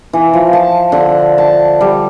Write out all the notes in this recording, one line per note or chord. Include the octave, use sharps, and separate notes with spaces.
E3
F3
A5
D3
A5
G3